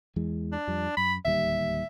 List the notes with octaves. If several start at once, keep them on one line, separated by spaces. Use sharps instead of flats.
E2 E3 G#3
D4
F2 F3 G3
F#2 B5
D1 D#2 G3 E5